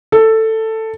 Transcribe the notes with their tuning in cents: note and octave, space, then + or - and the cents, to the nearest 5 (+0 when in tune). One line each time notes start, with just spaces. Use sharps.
A4 +10